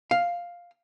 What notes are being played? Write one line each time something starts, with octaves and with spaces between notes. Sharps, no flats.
F5